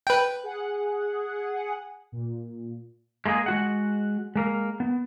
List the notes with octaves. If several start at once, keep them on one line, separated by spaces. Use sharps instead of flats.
B4 G5
G#4 F#5
A#2
G#3 A#3 D4 G#4
G#3 F#4 F#5
G#3 A#3 A#4
B3